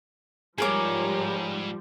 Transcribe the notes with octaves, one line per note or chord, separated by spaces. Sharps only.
G#2 F3 G3 G#4 A#4 C#5 A#5 D6